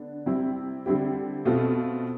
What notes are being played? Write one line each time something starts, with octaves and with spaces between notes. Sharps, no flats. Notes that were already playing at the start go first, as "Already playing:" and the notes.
Already playing: D3 B3 D4
C3 G3 C4 E4 G4
D3 G3 C4 E4 G4
B2 A3 C4 F4